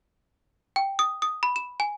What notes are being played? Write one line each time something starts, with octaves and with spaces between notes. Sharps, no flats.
G5
D#6
D#6
B5
E7
G#5